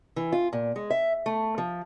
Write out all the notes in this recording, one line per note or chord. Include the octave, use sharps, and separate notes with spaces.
E3
F4
A#2
G#3
E5
A3
F3